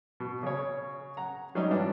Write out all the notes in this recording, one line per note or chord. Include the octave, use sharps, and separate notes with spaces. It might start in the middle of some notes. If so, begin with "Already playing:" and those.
B2
C#3 C#5
F#5 A#5
G#2 F#3 G3 C#4 D#4
G2 E3 B3 D4 E4